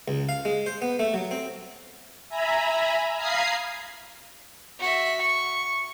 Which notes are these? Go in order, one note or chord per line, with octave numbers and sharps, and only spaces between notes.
C#2
F5
G#3
C5
B3
A3
F#3
C4
E5 G#5 A#5 B5
F5 A#5 B5 D#6 G#6 C7
F#4 E5
C#6